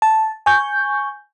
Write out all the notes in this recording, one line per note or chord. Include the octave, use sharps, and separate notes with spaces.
A5
G#5 C#6 G6